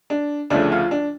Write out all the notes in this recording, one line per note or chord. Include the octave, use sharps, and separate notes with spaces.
D4
D2 C#3 F3 A3 D4
F4
D4